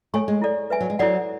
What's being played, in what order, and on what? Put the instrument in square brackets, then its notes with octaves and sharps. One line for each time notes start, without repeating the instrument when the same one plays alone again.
[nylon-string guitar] A3 [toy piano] A4 C#5 G#5 C#6
[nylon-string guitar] G#3
[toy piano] E4 A4 D5
B4 E5 G#5
[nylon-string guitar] F#3
G#3
[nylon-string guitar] F#3 [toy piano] E4 A4 D5 F#5